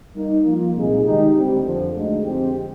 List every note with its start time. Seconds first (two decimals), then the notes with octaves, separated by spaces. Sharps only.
0.15 G3 A#3 D#4
0.46 F3 A#3 F4
0.75 C2 A#2 G#3 D#4 G#4
1.05 D#3 G#3 D#4 G4
1.35 D2 D3 G3 C4 G4
1.64 F2 D3 F3
1.94 D2 D3 G#3 D#4
2.25 F2 D3 G#3 C4 G4